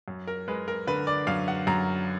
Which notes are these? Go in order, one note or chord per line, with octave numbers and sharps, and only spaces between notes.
F#2
A#4
G#3 B4
A#4
D3 B4
D5
F#2 F5
F#5
F#2 A#5